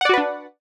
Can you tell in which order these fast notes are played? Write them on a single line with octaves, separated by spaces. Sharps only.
F#5 D5 F#4 B4 D4